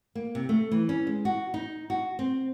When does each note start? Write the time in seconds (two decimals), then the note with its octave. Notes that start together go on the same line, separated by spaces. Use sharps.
0.15 A#3
0.35 C3
0.49 A3
0.71 E3
0.89 C#4
1.07 G#3
1.25 F#4
1.54 D#4
1.90 F#4
2.19 C4